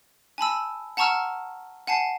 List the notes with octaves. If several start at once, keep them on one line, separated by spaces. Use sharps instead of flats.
G#5 A5 B5 E6
F#5 A5 A#5 C#6 E6 F6
F#5 G#5 A5 C7